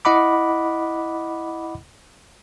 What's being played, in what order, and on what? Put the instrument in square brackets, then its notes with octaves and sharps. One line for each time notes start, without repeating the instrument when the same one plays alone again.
[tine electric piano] E4 D#5 F#5 B5 D6